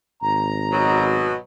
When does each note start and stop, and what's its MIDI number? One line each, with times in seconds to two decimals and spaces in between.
0.22 1.34 32
0.22 1.04 82
0.72 1.35 47
0.72 1.35 54